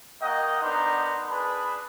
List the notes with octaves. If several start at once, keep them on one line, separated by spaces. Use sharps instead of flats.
A#3 F#4 D#5 F#5 G5
B3 D4 D#4 A#4 C5
D4 G#4 B4 B5